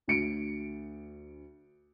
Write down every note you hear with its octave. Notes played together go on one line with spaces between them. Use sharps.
D2 C#7 D7